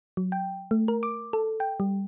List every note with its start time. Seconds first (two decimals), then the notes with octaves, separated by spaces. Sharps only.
0.17 F#3
0.32 G5
0.71 A3
0.88 A#4
1.03 D6
1.33 A4
1.60 G5
1.80 G3